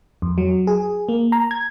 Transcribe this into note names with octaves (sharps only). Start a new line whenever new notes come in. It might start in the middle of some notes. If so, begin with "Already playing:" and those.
F2
F#3
G#4
A#3
A#5
G#6